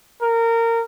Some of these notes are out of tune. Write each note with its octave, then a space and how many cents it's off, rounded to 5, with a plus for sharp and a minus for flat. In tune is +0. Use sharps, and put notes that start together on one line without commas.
A#4 -20